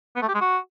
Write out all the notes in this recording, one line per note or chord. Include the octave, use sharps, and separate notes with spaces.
B3
A3
G4
G#3
F#4